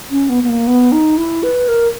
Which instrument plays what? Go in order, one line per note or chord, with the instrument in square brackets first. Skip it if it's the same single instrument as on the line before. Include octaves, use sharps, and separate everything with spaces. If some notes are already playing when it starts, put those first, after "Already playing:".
[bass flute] C#4
B3
B3
A#3
B3
D#4
E4
B4
A#4